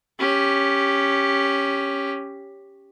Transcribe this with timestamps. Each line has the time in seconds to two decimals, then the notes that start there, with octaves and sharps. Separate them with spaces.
0.19 C#4 G4